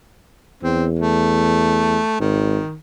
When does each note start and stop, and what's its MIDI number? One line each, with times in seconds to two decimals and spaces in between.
0.63 1.98 40
0.63 0.87 60
0.99 2.16 57
2.20 2.58 32
2.20 2.75 51